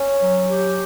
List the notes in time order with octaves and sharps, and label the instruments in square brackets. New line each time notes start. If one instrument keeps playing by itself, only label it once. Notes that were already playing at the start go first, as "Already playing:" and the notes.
Already playing: [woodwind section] C#4
F#3
G4